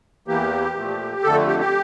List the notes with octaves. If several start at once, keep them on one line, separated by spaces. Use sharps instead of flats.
E2 E3 A#3 G4
A#2 F3 A3
F2 D3 A3 A4
G4
G4